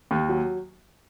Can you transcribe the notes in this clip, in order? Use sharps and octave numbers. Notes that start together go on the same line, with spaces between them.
D#2
F#3